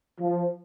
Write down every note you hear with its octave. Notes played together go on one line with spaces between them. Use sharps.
F3